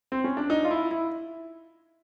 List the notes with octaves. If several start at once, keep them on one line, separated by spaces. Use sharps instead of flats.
C4
C#4
D4
D#4
F4
E4
E4